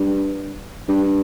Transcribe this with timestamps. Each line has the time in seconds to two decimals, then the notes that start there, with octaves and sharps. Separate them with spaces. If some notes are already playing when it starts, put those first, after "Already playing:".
Already playing: G2
0.89 G2